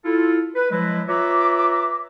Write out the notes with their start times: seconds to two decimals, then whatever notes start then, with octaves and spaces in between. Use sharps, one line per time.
0.05 E4 F4 A4
0.56 B4
0.71 F3 F#3 G#3 E4 B4 D#5
1.08 F4 B4 C#5 E5 A#5 D6